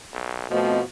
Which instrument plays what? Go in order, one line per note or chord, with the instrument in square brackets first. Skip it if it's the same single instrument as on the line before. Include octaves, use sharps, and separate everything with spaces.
[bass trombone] B1
[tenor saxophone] B2 [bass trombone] F3 [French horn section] A3 C4 D#5